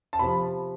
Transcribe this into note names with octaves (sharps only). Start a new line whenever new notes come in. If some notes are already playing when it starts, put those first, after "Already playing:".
A5
C3 F3 B5